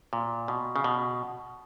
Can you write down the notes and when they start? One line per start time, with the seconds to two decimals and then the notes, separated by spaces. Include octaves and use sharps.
0.13 A#2
0.48 B2
0.76 C#3
0.84 B2